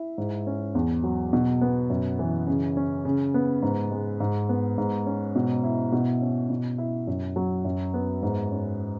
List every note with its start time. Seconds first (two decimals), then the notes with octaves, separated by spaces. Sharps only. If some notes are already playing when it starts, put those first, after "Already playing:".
Already playing: E4
0.18 G#2
0.47 C#4
0.75 E2
1.04 F#3
1.33 B2
1.61 B3
1.90 F#2
2.19 E3
2.47 C#3
2.77 C#4
3.05 C#3
3.34 B3
3.62 G#2
3.91 G#3
4.20 G#2
4.49 B3
4.78 G#2
5.07 C#4
5.35 B2
5.64 E4
5.92 B2
6.21 C#4
6.50 B2
6.78 E4
7.07 F#2
7.36 F#3
7.65 F#2
7.94 B3
8.23 G#2
8.51 C#4